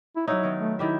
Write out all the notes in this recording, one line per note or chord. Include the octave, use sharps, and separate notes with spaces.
E4
F#3 D#4 E4 C#5 E5 F#5
D#3 B3
A3
D#3 E4 G4 E5